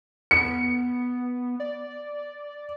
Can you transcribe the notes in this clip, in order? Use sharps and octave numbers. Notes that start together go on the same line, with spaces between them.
B3 C#7
D5